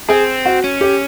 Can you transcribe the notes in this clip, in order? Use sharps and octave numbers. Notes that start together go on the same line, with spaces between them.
C4 G#4
F#4
C#4
G4